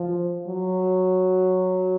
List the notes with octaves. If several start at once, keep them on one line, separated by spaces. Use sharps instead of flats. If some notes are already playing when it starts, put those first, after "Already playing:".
Already playing: F3
F#3